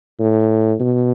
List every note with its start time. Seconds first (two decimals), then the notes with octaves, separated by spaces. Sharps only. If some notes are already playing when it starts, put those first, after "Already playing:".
0.19 A2
0.80 B2